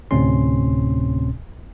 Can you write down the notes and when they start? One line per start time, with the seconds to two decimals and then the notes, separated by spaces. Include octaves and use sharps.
0.11 D2 A2 C3 C4 C#4 C6